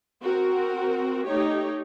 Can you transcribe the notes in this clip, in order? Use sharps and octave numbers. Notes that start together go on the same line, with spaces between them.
C4 F#4 A#4
A3 D#4 G4 C#5